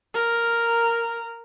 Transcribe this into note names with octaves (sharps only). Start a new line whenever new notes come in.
A#4